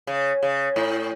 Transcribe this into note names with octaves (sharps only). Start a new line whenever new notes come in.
C#3
C#3
A2